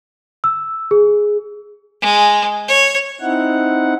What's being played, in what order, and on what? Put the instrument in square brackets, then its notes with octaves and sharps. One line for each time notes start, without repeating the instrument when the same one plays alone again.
[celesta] E6
G#4
[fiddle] G#3
C#5
[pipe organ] C4 D#4 E4 F#5